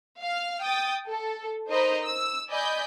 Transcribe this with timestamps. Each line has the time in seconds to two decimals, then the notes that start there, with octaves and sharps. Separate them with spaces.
0.20 F5 F6
0.62 G5 D#6 A6
1.08 A4
1.69 D#4 A#4 C5 D#5 A#5 B5
2.04 E6
2.50 D5 D#5 G#5 B5 G6